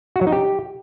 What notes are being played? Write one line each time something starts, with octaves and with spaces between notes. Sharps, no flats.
F#4
F#3
D#4
G4